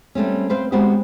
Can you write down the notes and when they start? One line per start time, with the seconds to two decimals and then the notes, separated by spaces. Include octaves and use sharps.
0.15 G3 A3 C4 C#4
0.49 C4 B4 C5 F5
0.72 G#3 B3 C4 F#4 G4